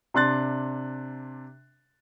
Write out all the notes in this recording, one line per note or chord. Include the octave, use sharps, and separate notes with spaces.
C3 D4 C6 F#6 A6